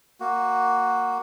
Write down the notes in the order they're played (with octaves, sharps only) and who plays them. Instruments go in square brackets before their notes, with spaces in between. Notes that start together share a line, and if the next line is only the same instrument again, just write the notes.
[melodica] A#3 F#4